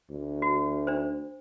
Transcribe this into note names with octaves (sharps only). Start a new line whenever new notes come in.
D2
F#4
D4 C5